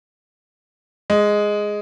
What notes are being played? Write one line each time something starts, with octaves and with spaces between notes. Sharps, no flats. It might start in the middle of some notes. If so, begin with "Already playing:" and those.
G#3